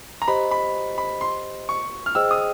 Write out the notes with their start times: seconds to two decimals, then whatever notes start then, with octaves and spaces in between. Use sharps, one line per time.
0.22 A#5
0.28 G4 C5 D#5 B5
0.51 B5
0.98 B5
1.21 C6
1.69 C#6
2.06 F6
2.15 G#4 C5 D#5 G5 E6
2.31 D#6